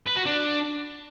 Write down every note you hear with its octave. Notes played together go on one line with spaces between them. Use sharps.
B4
F#4
D4